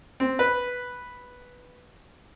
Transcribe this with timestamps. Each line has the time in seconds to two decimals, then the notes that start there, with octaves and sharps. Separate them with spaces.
0.20 C4
0.39 B4